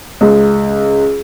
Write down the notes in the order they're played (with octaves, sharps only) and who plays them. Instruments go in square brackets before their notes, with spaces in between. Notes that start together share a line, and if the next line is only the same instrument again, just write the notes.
[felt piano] C#2